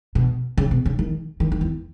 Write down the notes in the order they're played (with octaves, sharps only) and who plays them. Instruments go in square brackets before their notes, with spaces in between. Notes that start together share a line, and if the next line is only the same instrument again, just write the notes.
[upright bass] B2
C#3
B2
C#3
D#3
D#3
D#3
E2